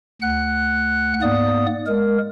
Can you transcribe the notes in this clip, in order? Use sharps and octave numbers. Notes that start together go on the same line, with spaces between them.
D2 F#5 F#6
G#2 A#3 B3 D5 D#6
G#3 A#4